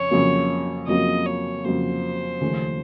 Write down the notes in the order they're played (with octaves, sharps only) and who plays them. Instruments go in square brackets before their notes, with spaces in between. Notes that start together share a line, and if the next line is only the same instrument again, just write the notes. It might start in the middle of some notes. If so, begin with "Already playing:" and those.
Already playing: [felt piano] F2 C#3 [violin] C#5
[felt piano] F2 C#3 F#3 A#3
[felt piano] F2 C#3 F#3 A#3 [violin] D#5
[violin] C#5
[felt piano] F2 C#3 F#3 A#3 [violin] C5
[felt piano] D#2 C#3 F3 A3 C#4